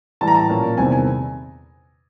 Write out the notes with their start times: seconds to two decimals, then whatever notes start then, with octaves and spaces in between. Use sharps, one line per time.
0.21 A2 E3 G3 A5
0.27 A#5
0.34 A5
0.49 A#2 F3 A#3 C#4
0.77 E2 C3 D#3 G3 C4 G#5
0.92 G#5